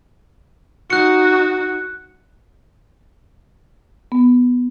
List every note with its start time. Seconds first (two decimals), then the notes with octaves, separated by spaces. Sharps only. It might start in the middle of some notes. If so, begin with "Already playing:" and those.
0.90 D#4 F#4 F#6 C#7
4.12 B3